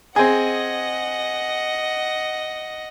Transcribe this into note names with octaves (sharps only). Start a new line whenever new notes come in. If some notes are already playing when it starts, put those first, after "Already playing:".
C4 G#4 D#5 F#5